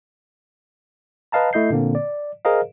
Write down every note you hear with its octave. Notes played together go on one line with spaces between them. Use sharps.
B4 D#5 F5 A5 A#5
A3 E4 D#5 G6 C7
A#2 D3 A#3 C4
D5
G#4 A#4 C5 D#5 F5